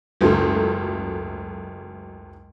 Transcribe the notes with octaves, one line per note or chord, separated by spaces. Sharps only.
F#1 C#2 G#2 F#3 A3 A4